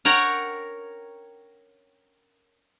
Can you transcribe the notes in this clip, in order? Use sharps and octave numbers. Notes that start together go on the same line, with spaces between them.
A#4 C#5 F#5 G5 A#5